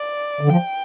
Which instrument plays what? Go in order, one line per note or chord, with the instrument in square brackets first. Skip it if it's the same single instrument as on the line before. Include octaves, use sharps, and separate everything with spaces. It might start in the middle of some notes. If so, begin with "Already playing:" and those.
Already playing: [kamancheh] D5
[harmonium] D3
[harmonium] F3 [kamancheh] G5